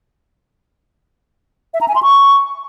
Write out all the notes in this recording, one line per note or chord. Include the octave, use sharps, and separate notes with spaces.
E5
A#5
G#5
C6
C#6